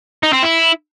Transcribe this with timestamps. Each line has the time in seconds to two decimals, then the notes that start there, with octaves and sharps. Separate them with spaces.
0.23 D#4
0.33 C4
0.43 E4